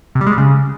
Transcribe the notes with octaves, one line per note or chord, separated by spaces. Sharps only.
C3
G3
G#3
G3
C#3